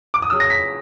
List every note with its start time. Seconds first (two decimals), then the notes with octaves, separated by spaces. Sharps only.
0.14 D6
0.22 D#6
0.30 C#3 F#3 E6
0.40 A#6
0.50 B6